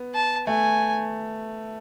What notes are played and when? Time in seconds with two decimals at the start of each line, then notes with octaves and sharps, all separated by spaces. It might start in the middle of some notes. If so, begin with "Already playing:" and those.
Already playing: B3
0.14 A5
0.47 A3 G#5